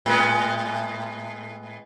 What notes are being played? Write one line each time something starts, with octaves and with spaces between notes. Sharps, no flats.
A2 G#3 B3